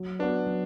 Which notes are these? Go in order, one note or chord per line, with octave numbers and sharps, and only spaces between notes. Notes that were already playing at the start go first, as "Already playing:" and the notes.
Already playing: F#3
B3 D4 F#4 B4
F#3